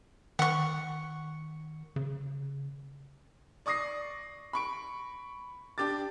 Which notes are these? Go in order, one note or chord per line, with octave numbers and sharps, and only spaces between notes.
D#3 F#5 C#6
C#3
D5 C#6 D#6 A#6 C7
B5 C#6 D7
D4 G4 D6 A6